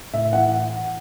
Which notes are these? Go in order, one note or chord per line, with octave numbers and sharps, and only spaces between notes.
A2 E5
E3 F#5